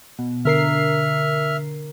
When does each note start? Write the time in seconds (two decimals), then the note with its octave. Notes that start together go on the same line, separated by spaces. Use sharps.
0.19 B2
0.45 D3 A#4 E5 F6 C7